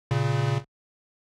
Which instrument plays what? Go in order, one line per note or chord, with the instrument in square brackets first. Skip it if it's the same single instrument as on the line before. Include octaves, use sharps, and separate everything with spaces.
[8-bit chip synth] A#2 C#3